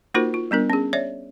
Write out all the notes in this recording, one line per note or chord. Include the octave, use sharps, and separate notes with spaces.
A#3 D#4 F4 F#4 A#4 C5
F4
G3 B3 D4 A#4
C#4 G#4
C#5 D5 E5